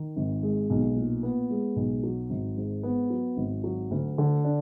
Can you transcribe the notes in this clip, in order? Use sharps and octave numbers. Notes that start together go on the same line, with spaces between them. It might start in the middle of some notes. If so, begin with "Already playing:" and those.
Already playing: D#3
G#1
G#3
B1
A#2
B3
G#3
B1
F#3
G#1
G#2
B3
F#3
G#1
F#3
D2
D3
D4